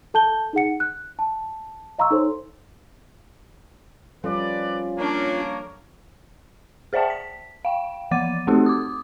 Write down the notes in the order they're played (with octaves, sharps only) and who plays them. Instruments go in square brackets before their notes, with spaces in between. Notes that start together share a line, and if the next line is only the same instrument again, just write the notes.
[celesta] A4 A5 G6 G7
D#4 G#4 F#5 C#7
F#6
A5
D#5 F5 A#5 C6 C#6 E6
D#4 A4 C5 C#5 C6
[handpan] F3 G3 A4 [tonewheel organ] C#4 F4 [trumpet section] B4 D5
[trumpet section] A#3 A#4 C#5 [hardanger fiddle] D4
[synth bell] G#4 C5 D5 E5 G5 A5
B6
F5 G5
E3 F3 F#5 D6 A6 D#7
A3 C4 D#4 F#4 G4 A4
D6 D#6